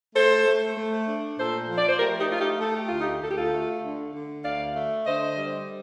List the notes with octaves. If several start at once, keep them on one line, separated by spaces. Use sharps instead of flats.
A3 A4 C5
A3
A3
D4
A#2 A4 C5
F3
D5
C5
A3 G4 A#4
D#4 G4
A3 F4
D#4 G4
A3 A4
G4
D2 F4
D#4 G4
D2 A4
G4
F4 A4
A3
D3
D3
D2 D5 F5
A3
D3 C5 D#5
G3